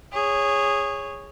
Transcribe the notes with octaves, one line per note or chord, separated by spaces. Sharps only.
G#4 C#5